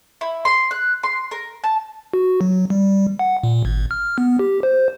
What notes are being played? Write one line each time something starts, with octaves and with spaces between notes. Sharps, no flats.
E4
C6
F#6
C6
A#4
A5
F#4
F#3
G3
F#5
A#2
G#1
F6
B3
G4
C5